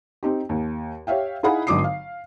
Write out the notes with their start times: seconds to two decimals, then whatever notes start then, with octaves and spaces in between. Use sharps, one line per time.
0.23 C4 D#4 G4
0.49 D#2
1.07 G4 C#5 E5 F5 G5
1.43 D#4 E4 G#4 F5 F#5 B5
1.67 G#1 D3 F#3 D6 D#6 C7
1.84 F5